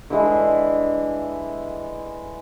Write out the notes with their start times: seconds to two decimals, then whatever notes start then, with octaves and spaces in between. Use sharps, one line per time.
0.10 D3 E3 G#3 E4